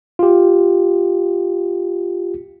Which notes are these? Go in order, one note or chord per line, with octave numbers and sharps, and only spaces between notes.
F4 G4